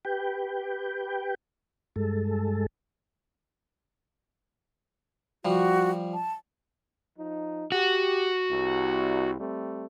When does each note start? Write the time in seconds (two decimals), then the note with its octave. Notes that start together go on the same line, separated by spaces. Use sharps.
0.05 G4 B4 G5
1.96 G2 G#3 A4
5.45 F3 G3 F#4
6.14 A5
7.19 F3 D#4
7.72 F#4 G4
8.51 C2
9.40 G3 A3 C4